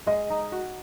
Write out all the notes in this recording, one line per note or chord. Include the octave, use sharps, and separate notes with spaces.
G#3 D#5
D#4
F#4